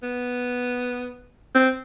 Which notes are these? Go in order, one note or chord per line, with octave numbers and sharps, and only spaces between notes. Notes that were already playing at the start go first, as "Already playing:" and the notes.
B3
C4